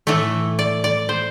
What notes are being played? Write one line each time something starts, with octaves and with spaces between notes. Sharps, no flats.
A2 E3 A3
D5
D5
C5